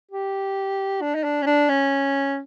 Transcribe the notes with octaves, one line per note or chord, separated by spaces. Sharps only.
G4
D4
D#4
D4
C#4
D4
C#4